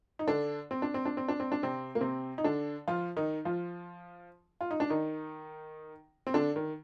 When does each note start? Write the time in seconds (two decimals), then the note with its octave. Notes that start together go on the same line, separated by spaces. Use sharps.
0.19 D#4
0.28 D3 D4
0.71 C4
0.82 D4
0.94 C4
1.05 D4
1.17 C4
1.28 D4
1.40 C4
1.52 D4
1.63 C3 C4
1.95 A#3
2.01 C3 C4
2.38 D#4
2.44 D3 D4
2.88 F3 F4
3.17 D#3 D#4
3.45 F3 F4
4.61 F4
4.71 D#4
4.80 D4
4.90 D#3 D#4
6.27 C4
6.34 D3 D4
6.56 D#3